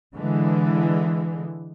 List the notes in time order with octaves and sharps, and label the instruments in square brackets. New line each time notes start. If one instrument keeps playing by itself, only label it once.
[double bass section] D3 E3 G#3